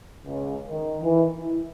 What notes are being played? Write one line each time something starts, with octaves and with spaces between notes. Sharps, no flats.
C#2
D#3
E3
E4